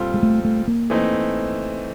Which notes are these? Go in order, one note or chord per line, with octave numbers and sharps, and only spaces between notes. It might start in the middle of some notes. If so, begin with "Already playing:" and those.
Already playing: A#2 G3 C4 F4 A4
G#3
A3
A3
A#3
E3 A3 C4 D#4